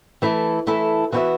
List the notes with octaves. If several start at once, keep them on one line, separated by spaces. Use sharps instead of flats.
E3 A3 E4 A4
E3 A3 E4 A4
E3 B3 F#4 C5 E5